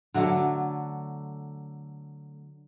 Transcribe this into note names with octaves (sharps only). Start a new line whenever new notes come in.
D3 F#3 A3